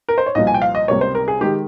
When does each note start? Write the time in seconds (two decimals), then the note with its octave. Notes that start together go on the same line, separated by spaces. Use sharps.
0.09 A#4
0.18 C5
0.26 C#5
0.35 C2 A#2 F3 D#5
0.47 G#5
0.54 G5
0.62 F5
0.75 D#5
0.88 C#2 C3 G3 A#3 C#5
1.01 C5
1.15 A#4
1.28 G#4
1.41 D#3 G#3 G4